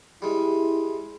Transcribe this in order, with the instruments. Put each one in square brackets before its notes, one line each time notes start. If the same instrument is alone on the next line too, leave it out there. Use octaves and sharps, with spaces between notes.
[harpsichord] G3 G#3 [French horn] E4